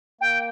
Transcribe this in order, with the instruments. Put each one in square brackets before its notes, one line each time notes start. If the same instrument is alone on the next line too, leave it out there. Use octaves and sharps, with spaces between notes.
[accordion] A#3 [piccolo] G5